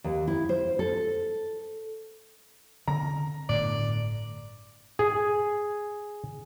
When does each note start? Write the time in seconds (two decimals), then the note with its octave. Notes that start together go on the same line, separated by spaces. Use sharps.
0.04 D#2
0.27 E4
0.49 C5
0.79 A4
2.88 D3 C4 A#5
3.49 G1 A2 D3 D5
4.99 G#4